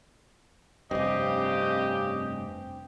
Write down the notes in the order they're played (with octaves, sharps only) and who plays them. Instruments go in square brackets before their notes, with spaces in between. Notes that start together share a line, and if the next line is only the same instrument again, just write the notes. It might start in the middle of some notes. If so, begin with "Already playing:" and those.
[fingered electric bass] F1 G2 [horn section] C#3 G4 [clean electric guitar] C4 [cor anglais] D#5